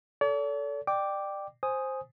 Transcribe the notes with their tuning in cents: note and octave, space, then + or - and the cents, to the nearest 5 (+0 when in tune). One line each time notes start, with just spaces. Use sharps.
A4 +0 D5 -45
D5 +30 G5 +0 D6 +0
C5 +5 G#5 +0 D#6 +0